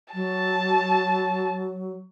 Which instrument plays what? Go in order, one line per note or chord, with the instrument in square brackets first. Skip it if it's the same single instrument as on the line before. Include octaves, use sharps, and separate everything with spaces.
[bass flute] F#3 [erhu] A5